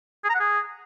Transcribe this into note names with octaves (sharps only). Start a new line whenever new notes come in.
G#4
A#5
F#5
G#4